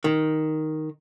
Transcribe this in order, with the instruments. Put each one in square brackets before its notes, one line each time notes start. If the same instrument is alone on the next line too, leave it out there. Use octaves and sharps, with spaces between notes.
[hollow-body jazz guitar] D#3